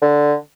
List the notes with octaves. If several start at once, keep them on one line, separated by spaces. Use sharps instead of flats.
D3